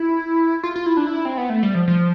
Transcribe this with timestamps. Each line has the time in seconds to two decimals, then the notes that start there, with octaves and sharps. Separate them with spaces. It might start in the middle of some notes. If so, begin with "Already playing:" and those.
Already playing: E4
0.63 F4
0.76 F4
0.86 E4
0.97 D4
1.07 E4
1.25 C4
1.38 B3
1.50 A3
1.63 G3
1.75 F3
1.88 F3